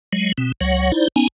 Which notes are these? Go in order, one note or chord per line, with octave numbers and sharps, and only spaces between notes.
F#3 G#3
B2 C4
C#2 F#3 C#5 F#5
D#4 E4 C5 D5
B3 C#4 D#4 G#5